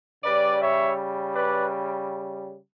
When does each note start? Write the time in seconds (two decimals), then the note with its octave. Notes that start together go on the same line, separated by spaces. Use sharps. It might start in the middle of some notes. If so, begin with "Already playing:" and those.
0.24 C#3 G3 B4 D5
0.60 C#5 E5
1.33 B4 D5